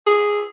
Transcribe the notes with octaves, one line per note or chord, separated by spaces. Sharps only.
G#4